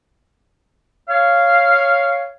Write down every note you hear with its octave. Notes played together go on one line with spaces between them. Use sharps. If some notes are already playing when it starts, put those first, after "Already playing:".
C#5 F5